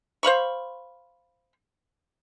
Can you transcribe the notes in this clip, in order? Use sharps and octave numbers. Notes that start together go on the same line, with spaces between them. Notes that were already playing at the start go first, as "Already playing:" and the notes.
C5 F5 B5 C#6